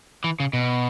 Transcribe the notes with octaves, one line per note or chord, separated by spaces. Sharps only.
E3
C#3
B2